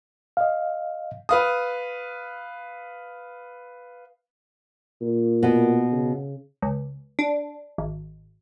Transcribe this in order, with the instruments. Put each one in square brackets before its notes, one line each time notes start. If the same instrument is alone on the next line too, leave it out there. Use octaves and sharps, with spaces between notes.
[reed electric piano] D#5 F5
[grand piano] B4 F5 D#6
[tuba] A#2
[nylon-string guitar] B2 B3
[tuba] C#3
[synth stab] C#2
D4
G#1